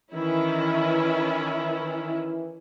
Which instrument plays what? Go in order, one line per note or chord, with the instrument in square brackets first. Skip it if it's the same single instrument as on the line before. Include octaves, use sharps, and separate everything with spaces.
[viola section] D#3 C#4 E4 [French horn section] E3